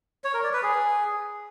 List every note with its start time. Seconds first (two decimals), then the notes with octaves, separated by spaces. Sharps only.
0.24 C#5
0.34 A#4
0.43 D5
0.53 B4
0.63 G#4